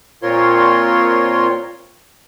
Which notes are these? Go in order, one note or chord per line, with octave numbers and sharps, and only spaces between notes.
A#2 C4 F4 A#4 C#5 C6